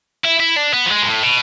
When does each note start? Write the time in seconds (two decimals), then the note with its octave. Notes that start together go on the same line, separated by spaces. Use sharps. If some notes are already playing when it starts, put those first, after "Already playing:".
0.25 E4
0.40 E4
0.56 D4
0.73 B3
0.86 F3
0.90 G#3
1.02 B2
1.06 A2
1.23 B2